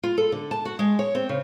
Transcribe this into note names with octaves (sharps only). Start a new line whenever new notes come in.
F4
A4
D3
A5
F#4
G#3
C#5
C4
C#3